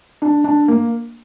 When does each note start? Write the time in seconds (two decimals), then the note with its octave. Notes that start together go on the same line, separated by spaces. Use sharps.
0.22 D4
0.44 D4
0.68 A#3